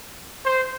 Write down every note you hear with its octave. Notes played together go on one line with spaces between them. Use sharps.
C5